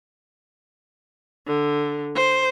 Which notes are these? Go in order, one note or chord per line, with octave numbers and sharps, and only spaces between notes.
D3
C5